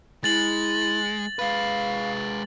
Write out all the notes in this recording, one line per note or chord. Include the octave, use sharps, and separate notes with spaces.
G#3 E4 A6 F#7
G#3 B4 F5